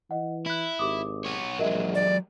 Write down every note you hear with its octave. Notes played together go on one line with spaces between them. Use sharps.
E3 D#5 F#5
E4 F#6 B6
G#1 G4 D6 D#6
B3 C#5
A#1 F#3 G#3 A#4 D#5 E5
D5